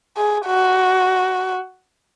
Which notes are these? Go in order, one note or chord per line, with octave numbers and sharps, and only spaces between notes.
G#4
F#4